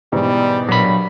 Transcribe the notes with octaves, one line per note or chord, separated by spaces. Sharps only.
G#2 B2 E3 G3
G2 A#2 F#3 B5